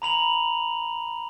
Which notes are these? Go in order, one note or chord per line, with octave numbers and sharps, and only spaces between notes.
A#5 B5 F7 F#7